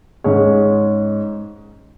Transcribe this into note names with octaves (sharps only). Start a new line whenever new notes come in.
G#2 G#3 C#4 G#4 C#5